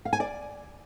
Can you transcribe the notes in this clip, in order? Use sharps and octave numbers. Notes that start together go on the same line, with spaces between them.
F5
G#5
D5